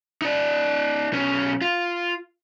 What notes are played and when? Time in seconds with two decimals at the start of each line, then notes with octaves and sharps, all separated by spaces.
0.22 D#4 D5
1.13 B1 C#4
1.61 F4